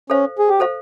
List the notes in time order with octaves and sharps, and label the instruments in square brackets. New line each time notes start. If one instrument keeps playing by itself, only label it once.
[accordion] C#4 [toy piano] A4 C5 F5
[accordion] G#4
G4
[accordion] F#4 [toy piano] A4 C5 F5